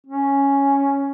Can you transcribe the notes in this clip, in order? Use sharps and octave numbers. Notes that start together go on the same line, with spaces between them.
C#4